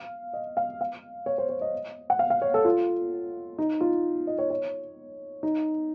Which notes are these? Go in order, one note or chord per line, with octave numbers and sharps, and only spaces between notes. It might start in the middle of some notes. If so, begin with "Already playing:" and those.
Already playing: F5
D#5
F5
F5
C#5
C5
C#5
D#5
F#5
F5
F5
C#5
A4
F4
D#4
F4
D#5
C#5
C#5
D#4